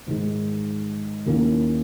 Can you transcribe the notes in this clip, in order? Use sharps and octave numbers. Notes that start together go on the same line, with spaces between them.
G#2 D#3 G#3 D#4
D#2 D#3 A#3 C#4 E4